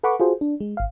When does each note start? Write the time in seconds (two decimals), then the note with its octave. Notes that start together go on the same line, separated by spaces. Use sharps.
0.03 A4 B4 F#5 B5 C#6 D6
0.20 F4 F#4 G#4 A4 C5
0.41 D4
0.60 G#3
0.77 G#1 F5